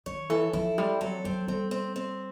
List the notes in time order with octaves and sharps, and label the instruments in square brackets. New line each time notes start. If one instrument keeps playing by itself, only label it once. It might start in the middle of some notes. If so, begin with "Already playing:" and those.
[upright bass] D#3 [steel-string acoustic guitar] C#5
[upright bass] E3 [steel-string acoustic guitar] A4
[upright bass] F3 [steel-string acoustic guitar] E4
[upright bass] G3 [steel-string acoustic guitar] C4
[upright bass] F#3 [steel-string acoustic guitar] A4
[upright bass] F#3 [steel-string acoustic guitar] C4
[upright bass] G3 [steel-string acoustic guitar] C4
[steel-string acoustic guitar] C4
C4